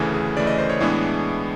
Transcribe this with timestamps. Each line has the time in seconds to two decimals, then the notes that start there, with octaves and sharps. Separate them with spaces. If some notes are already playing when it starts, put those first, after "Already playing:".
Already playing: D2 C#3 E3 A3 G#4
0.14 G#4
0.37 D2 C#3 E3 A3 D5
0.47 D#5
0.58 C5
0.70 C#5
0.80 A2 E3 G#3 B3 D4 G#4